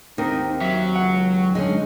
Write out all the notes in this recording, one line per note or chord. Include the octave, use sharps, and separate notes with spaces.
D#2 C4 D#4 A#4
F#3 E5
C#2 F#5
F#2 D3 G#3 C#4 D#4